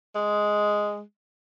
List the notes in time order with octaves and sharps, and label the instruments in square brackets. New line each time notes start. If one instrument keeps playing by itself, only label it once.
[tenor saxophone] G#3